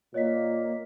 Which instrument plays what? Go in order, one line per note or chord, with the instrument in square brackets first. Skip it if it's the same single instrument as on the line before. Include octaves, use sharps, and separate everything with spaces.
[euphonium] A#2 [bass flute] A#3 [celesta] C#5 D#5 B6